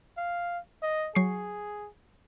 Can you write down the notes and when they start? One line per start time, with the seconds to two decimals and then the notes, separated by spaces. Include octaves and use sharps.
0.17 F5
0.82 D#5
1.15 F#3 G#4 C#6 C7